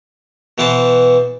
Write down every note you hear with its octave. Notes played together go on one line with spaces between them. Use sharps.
B2 E3 B3 C5 A5